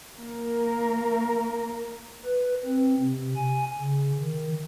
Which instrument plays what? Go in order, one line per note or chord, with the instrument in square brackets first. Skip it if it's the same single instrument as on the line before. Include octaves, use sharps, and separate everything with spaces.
[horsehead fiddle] A#3 A#4
[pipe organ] B4
C4
C3
G#5
C#3
D#3